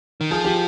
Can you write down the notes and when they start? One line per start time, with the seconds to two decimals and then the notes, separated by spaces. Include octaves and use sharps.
0.21 D#3
0.31 F3 G#4
0.45 G4